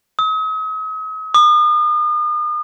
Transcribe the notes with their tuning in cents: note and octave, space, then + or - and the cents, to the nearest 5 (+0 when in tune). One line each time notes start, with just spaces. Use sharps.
D#6 +40
D#6 -40